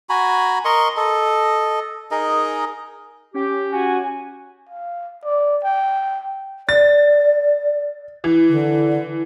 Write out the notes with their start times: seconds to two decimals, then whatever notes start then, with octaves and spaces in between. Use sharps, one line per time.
0.09 F#4 G#5 A#5 B5
0.65 A#4 D#5 C6 C#6
0.97 A4 D#5
2.11 D#4 G#4 A#4 D#5
3.34 C#4 G4
3.72 F#4 G#5
4.69 F5
5.25 D5
5.64 G5
6.69 D5 A6
8.24 E3
8.49 D3